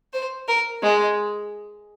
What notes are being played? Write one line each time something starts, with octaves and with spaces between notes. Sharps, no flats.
C5
A#4
G#3